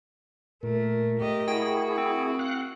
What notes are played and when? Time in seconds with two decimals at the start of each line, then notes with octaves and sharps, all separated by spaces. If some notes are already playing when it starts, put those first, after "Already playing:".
0.63 A#2 A3 A#4
1.18 A3 G4 D#5
1.48 E4 F#4 G#4 G5
1.98 C4
2.39 F5 F#5 F#6